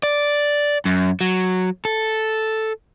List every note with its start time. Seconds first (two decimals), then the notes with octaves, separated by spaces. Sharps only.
0.03 D5
0.85 F#2
1.21 F#3
1.85 A4